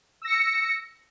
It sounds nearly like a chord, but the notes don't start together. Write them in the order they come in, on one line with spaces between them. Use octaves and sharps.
E6 A#6 C#7